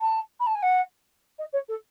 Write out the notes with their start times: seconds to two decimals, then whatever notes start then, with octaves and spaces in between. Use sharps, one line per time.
0.01 A5
0.40 B5
0.46 A5
0.55 G#5
0.62 F#5
1.38 D#5
1.53 C#5
1.68 A4